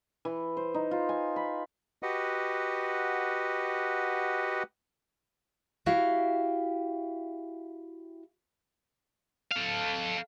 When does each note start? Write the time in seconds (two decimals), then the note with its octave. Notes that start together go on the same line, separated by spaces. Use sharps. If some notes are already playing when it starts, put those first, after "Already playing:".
0.25 E3
0.57 C5
0.74 D#4
0.91 F4
1.09 G#5
1.36 B5
2.03 F#4 G4 B4 D#5 F#5
5.86 E4 F#4 G4 E5 F5
9.51 A4 F5